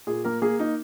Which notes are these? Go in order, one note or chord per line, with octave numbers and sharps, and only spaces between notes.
A#2 G#4
A#3 A#4
A#3 G#4
A#3 D#4